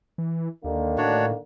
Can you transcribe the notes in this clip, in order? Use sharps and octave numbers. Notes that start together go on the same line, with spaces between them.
E3
D#2 D3 D#3 A#3
A2 D4 F#4 C#5